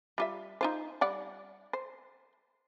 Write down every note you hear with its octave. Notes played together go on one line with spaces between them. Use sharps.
G3 F4 E5
D#4 F4 C5
G3 D5 F#5
C5